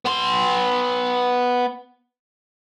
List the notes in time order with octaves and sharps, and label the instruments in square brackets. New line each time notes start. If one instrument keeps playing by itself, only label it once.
[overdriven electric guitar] B3 C6